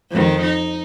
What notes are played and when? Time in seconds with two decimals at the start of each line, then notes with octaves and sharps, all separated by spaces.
0.11 F2 D#3
0.42 D#4